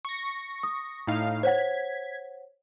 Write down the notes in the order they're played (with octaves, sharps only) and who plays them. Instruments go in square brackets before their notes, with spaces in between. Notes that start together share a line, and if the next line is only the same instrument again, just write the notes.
[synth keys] C#6 A#6
[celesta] D#6
[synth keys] A2 D#4 F5
[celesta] C5 C#5 F#5 [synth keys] G#6 B6